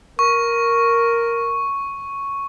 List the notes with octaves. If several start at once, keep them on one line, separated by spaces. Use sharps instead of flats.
A#4 C#6